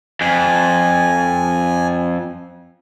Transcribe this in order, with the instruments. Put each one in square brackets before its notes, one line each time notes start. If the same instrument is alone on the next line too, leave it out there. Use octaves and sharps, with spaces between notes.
[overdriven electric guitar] F2 [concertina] G#5